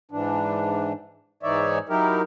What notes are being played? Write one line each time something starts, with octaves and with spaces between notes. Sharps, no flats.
G#2 E3 D4
G#2 E3 D#4 C#5 D5 E5
F#3 D#4 E4 G4 A#4